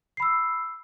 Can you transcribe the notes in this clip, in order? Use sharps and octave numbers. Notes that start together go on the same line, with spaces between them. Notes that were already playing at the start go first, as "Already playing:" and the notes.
B5 E6 C7